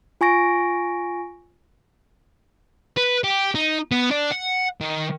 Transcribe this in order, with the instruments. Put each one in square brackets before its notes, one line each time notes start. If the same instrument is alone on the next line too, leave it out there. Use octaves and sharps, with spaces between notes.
[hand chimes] F4 G#5 C#6 A#6 D7
[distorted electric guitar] B4
G4
D#4
B3
D4
F#5
D#3